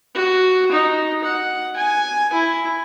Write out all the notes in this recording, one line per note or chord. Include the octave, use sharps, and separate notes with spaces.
F#4
D#4
F#5
G#5
E4